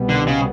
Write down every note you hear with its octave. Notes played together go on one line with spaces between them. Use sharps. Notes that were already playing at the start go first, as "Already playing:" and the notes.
Already playing: C2 B2 G3 B3
D3
C#3